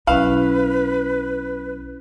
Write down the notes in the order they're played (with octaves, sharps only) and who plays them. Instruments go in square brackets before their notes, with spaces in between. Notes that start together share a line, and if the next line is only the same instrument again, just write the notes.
[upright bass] B1 [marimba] C#4 E4 [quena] B4 [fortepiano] F5